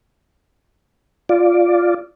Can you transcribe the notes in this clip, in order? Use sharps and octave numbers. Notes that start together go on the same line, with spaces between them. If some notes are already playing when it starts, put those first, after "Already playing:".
F4 D5